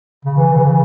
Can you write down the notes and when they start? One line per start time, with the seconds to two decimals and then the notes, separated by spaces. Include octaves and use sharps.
0.25 C#3
0.37 E3
0.53 C#3
0.57 E3
0.67 C#3